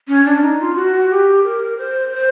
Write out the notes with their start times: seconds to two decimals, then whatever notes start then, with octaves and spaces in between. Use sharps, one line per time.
0.08 C#4
0.25 D4
0.42 D#4
0.60 F4
0.76 F#4
1.10 G4
1.44 A#4
1.78 C5
2.12 C5